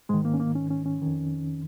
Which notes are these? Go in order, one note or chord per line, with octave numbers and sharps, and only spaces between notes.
G#2 D#3 G#3
A#3
C#4
A#3
C#4
C#4
C#4
F2 D#3